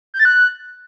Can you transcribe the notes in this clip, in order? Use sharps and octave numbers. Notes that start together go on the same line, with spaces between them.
G6
A6
F#6